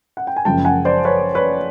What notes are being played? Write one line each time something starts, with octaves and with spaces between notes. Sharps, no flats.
F#5
G5
G#5
F#1 F#2 C#3 F3 G#3 G5 A5
F#5 G#5
C5 D5
B4 C#5
B4 C#5